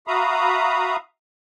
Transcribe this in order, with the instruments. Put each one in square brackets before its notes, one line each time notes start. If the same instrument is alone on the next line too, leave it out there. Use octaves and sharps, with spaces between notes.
[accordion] F#4 E5 F5 A#5 B5 D#6